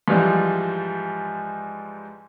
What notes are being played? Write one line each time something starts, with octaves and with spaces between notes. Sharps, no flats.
G#2 E3 F3 G3